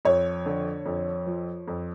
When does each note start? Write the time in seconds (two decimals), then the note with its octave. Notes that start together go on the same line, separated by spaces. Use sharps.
0.05 F2 C#5
0.46 D3
0.86 F2
1.27 F3
1.68 F2